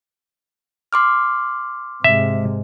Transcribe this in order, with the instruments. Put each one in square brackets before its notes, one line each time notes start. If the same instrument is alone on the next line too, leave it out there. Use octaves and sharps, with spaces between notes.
[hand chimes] C6 D6 F6
[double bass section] G#2 C3 G#3 [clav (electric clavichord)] E5